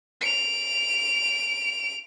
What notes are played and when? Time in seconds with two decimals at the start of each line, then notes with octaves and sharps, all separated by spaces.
0.21 D7 F7